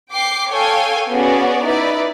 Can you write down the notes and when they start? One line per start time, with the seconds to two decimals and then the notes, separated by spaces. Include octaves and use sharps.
0.12 G5 D6 C7
0.51 A4 C#5 F5 G5 G#5
1.10 B3 C#4 F#4 G#4 D5
1.64 D#4 E4 B4 D5